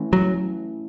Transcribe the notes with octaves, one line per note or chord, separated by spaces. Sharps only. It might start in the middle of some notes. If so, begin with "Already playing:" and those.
Already playing: E3 A3 C#4 E4
F#3